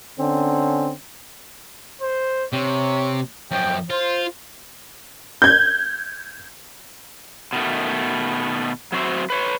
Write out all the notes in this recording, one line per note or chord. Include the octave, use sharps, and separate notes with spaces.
D3 C4 C#4
C5
C3 C#5
F#2 F3 G5
F4 C5
G6 G#6
B2 D#3 A3
F#3 C4 F#4 C5 E5
B4 C#5